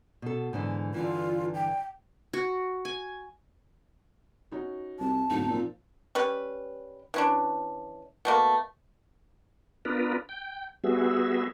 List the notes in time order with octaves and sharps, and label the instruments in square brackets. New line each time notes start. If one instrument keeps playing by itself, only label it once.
[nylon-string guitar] B2 A4
G#2 D3 E3
[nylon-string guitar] G2 D3 E3 [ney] F4
[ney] G5
[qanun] F#4
G#5
[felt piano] C#4 D#4 F#4
[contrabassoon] C2 [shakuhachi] A5
[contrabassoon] D1 [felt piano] G#2 B2 [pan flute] D#4
[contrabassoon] A#2 [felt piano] F3 C4
[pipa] G3 C#4 B4
E3 C#4 D4
B2 A3 A#3
[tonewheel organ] B3 D4 F4 A#4 B4
G5
G3 B3 F#4 G#4 E5